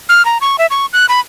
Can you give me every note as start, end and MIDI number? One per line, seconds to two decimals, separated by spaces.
0.09 0.25 89
0.25 0.38 82
0.41 0.56 85
0.58 0.66 76
0.70 0.86 85
0.93 1.06 90
1.09 1.20 83